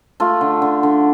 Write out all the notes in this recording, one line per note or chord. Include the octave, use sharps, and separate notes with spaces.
A3 F4
D3
D3
D3